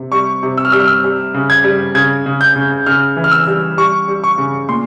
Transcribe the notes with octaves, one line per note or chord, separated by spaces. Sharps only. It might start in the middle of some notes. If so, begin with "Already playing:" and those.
Already playing: C3
G3 C#6
C3
E6
F6
G3 E6
F6
E6
G3
C#3
G#6
G3
C#3 G#6
C#3
G6
C#3
C#3 F6
E3
F6
E6
G3
G3 C#6
G3
C#6
C#3
A#2 C6